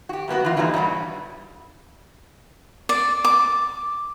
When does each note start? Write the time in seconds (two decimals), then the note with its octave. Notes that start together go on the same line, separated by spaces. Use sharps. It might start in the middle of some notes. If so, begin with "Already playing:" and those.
0.09 F#4 G4
0.28 F#2 A#3 B3 F#4
0.44 E3 F4
0.56 D3 E3 G3 A#3 D#4
0.74 G2 B2 F#3 G3
2.89 D5
3.25 D6